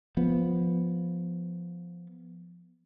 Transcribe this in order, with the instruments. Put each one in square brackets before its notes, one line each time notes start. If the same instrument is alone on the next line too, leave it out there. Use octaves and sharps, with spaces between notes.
[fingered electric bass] F3 B3